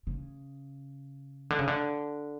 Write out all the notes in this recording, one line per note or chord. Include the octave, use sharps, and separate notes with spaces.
C#3
D3
C#3
D3